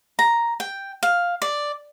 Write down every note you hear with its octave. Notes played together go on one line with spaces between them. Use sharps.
A#5
G5
F5
D5